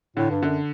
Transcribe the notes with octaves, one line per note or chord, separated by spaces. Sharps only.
A2 D3
G2
F#2 D3